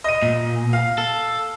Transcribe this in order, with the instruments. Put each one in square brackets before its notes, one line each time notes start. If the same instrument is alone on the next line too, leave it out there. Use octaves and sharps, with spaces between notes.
[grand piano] D#5 D#7
[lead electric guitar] A#2
[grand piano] F5
[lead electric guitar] A4